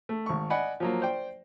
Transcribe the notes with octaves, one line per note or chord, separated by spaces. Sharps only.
A3
G#1 C#6
D5 D#5 F#5 G#5 B5
F3 F#3 A#3
C5 D5 G5